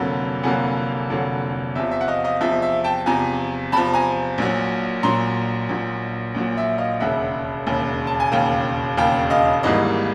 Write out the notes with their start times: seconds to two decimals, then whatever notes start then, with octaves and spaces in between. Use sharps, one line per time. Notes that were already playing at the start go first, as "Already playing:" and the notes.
Already playing: F1 F2 D3 F#3 A#3
0.43 F1 F2 D3 F#3 A#3 F#5 G#5
1.10 F1 F2 D3 F#3 A#3
1.75 E2 C3 F3 E5
1.91 E5
2.01 F#5
2.08 D#5 F5
2.24 D#5 F5
2.41 E2 C3 F3 E5
2.62 E5
2.84 G5 A5
3.06 E2 C3 F3 G#5 A#5
3.72 E2 C3 F3 A5 B5
3.94 G#5 A#5
4.38 A#1 A#2 F#3
5.03 A#1 A#2 F#3 A#5 C6
5.69 A#1 A#2 F#3
6.35 A#1 A#2 F#3
6.57 E5
6.78 D#5 F5
7.00 E1 D#2 C#3 E5 F#5
7.66 E1 D#2 C#3
8.07 A5
8.20 G#5
8.32 E1 D#2 C#3 F5 G5
8.97 E1 D#2 C#3 F5 G5
9.30 D#5 F5
9.63 G#1 G#2 E3 G3 A#3 D#5